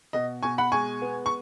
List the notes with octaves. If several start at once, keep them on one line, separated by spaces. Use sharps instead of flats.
B2 D#5
B2 G#5 C#6
F#5 B5
G#3 G#5 C#6
B3
C#6